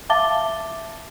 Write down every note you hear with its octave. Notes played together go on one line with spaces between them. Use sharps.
E5 F5 A5 D6 A6 G7